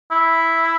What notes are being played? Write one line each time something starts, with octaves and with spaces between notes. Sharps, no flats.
E4